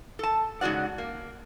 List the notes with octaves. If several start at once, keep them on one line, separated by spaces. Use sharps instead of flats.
A4 A5
G#2 C#3 F#4 D5 F#5
A#3